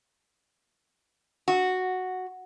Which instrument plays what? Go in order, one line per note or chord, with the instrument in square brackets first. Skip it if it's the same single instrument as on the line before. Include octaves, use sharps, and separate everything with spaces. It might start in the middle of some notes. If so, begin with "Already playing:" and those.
[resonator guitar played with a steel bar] F#4